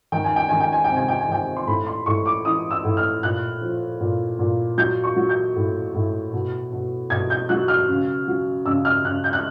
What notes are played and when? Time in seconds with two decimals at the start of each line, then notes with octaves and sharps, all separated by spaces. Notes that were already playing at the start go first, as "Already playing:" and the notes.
0.12 D#3 G5
0.24 G#5
0.36 G5
0.49 D#3 G#5
0.60 G5
0.73 G#5
0.84 G5
0.90 C3
0.96 G#5
1.08 G5
1.20 G#5
1.28 D#3 G5
1.57 C6
1.67 A2 B5
1.87 C6
2.06 A2 C#6
2.26 D6
2.45 E3 D#6
2.71 E6
2.84 A2
2.97 F6
3.23 A#2 F#6
3.61 F3
4.00 A#2
4.39 A#2
4.78 F#3 G6
5.04 C#6
5.16 F#3
5.29 G6
5.56 A2
5.95 A2
6.33 B2
6.72 B2
7.10 B2 G#6
7.30 G6
7.49 F#3 F#6
7.68 F6
7.88 C#3
8.28 F#3
8.66 C#3 E6
8.85 F6
9.04 C#3 F#6
9.24 G6
9.33 F#6